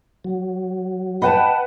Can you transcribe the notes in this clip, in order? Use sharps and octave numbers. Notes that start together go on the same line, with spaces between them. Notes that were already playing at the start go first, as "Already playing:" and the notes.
F#3
B4 D#5 F#5 G5 A5 B5